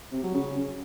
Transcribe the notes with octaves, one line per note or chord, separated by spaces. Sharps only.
C3
F#3
C#3